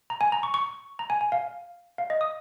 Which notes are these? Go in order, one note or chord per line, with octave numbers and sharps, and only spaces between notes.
A#5
G#5
A#5
C#6
C#6
A#5
G#5
G#5
F5
F5
D#5
D#6